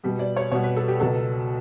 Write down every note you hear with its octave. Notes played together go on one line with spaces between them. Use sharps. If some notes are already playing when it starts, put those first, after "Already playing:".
B2 G3 B3
D5
C#5
B2 G3 B3 C#5
B4
A4
G4
C#2 B2 F#3 B3 A4